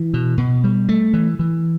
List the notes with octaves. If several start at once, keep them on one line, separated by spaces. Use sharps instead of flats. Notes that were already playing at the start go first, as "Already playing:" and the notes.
Already playing: E3
B2
B2
G3
A3
E3
E3